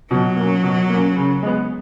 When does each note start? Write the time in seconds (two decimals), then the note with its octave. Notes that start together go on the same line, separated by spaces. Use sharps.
0.10 B2 F#3
0.37 A#3 C#4
0.63 B2
0.90 A#3 C#4
1.16 C#3
1.43 G#3 B3